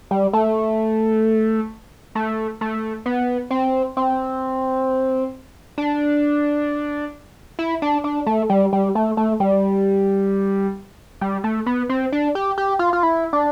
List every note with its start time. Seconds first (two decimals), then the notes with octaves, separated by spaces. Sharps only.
0.11 G3
0.33 A3
2.15 A3
2.61 A3
3.06 B3
3.51 C4
3.97 C4
5.78 D4
7.59 E4
7.82 D4
8.04 D4
8.26 A3
8.50 G3
8.73 G3
8.95 A3
9.17 A3
9.40 G3
11.21 G3
11.44 A3
11.66 B3
11.89 C4
12.12 D4
12.35 G4
12.58 G4
12.79 F4
12.93 F4
13.03 E4
13.33 D4